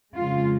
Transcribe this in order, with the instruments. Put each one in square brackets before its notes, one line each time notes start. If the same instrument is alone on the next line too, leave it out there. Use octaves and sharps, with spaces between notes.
[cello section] F2 C#3 G#3 F4